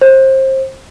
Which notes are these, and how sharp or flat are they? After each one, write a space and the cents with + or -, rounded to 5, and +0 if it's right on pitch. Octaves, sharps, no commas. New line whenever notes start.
C5 +25